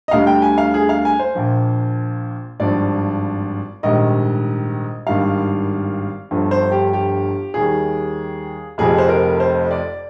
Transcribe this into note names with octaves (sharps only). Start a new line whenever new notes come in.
D#5
D2 D3 G3 F5
G5
G#5
F5
G#4
F5
G#5
C5
A#1 A#2 F3
G#1 G2 F3 D5
A#1 G#2 D#3 G3 D#5
G#1 G2 D#3 G3 F5
G1 G2 F3
C5
G4
G4
D#2 D#3 G3 G#4
F1 F2 C3 F3 G#4
C5
A#4
C5
D5